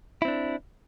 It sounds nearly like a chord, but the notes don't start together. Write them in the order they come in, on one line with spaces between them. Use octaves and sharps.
E4 C4 D4